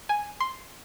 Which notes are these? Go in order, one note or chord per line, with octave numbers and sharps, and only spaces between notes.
G#5
C6